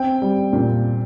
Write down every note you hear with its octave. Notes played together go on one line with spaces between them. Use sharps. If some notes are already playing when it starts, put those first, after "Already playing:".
Already playing: C4 G5
G3
A#2